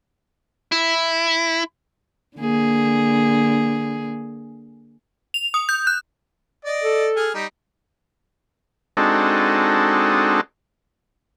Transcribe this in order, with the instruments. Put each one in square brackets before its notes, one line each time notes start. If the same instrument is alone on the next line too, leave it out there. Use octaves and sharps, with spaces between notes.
[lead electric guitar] E4
[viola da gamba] D3 A#3 G#4
[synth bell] F7
D#6
G6
F#6
[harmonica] D5 D#5
[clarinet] A4
[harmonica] G#4 F6
G3 D#4
[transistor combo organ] G#3 C4 D4 D#4 F#4 A4